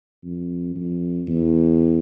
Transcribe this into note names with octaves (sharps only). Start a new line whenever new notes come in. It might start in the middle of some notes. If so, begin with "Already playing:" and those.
F2
F2
E2